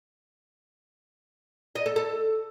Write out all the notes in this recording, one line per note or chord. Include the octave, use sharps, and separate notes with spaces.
D#5
A4
A4